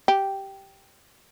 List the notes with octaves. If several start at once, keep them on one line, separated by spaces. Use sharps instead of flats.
G4